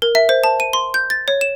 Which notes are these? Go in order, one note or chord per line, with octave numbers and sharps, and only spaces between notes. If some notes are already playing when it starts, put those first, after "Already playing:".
A#4
E5
C5
A5
D#7
C6
G6
A6
C#5
E7